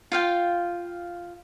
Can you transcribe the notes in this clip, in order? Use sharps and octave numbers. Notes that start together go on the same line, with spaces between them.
F4 F5 G5